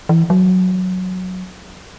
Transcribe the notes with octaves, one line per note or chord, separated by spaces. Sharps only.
E3
F#3